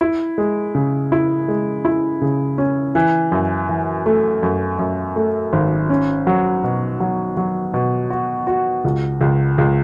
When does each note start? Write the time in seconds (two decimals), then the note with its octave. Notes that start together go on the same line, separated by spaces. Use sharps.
0.01 E4
0.38 G#3
0.75 C#3
1.12 E4
1.48 G#3
1.85 E4
2.21 C#3
2.58 C#4
2.95 E3
3.32 F#2
3.69 E3
4.06 A3
4.43 F#2
4.79 F#2
5.16 A3
5.53 G#1
5.90 C#4
6.27 F#3
6.64 B2
7.00 F#3
7.37 F#3
7.74 B2
8.10 F#4
8.47 F#4
8.84 C#2
9.21 C#2
9.58 C#2